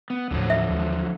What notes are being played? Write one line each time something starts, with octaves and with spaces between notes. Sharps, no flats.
B3
D#2 A2 D3 F3 F#3
E5
D#2 G#3